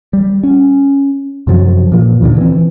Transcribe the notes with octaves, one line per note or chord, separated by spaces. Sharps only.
G3
C#4
F#2 C3 F3 F#3
A#2 E3 F3
D#2 A#2 D3
E3 C4